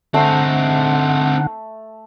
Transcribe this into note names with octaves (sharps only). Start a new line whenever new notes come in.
D3 A3 C4 D#4 F#5